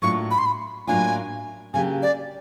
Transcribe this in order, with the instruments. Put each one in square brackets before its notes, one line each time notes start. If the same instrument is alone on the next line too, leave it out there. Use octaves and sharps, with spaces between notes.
[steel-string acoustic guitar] A2 F#3 A#3 D4 F4 [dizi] C#6
[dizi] B5
C6
B5
[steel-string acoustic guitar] A2 F#3 A#3 D4 F4 [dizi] G#5
[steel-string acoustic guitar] C#3 F#3 A#3 D4 G4 [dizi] G#5
[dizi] D5